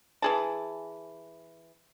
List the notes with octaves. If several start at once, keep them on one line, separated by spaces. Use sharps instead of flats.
E3 G#4 A5